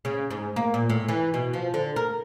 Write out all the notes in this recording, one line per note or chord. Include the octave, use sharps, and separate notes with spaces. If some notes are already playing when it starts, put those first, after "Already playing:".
C#3
G#2
A#3
A#2
A2
E3
B2
F3
D3
A#4